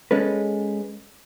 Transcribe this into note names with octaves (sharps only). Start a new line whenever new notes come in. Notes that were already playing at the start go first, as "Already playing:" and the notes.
G#3 C#4 A4 B4